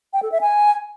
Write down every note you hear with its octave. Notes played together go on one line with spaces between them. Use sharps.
G5
A4
E5
G#5